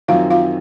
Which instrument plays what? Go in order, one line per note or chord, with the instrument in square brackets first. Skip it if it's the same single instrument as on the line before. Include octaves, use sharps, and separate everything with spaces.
[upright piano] F#2 D#3 F#3 C4 [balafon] F4 F5
[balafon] F4 F5